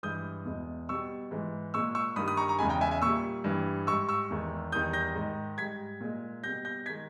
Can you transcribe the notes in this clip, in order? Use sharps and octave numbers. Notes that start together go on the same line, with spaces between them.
G2 E3 G#3 D#6 G6
E2 B2 G#3
B2 G3 C#6 E6
G#2 E3 G#3
A#2 G#3 C#6 E6
C#6 E6
G2 D#3 G3 B5 D#6
B5 D#6
A#5 C#6
A#5 C#6
E2 C#3 G#3 G#5 B5
G5 A#5
E5 G#5
E5 G#5
A#2 G3 C#6 E6
G2 E3 G3
G#2 G3 C#6 E6
C#6 E6
E2 D#3 G#3
E2 D#3 G3 D#6 G6
G6 A#6
G#2 D#3 G#3
G#2 G3 G#6 B6
A#2 G#3
B2 G3 G6 A#6
G6 A#6
D#3 G#3 G#6 B6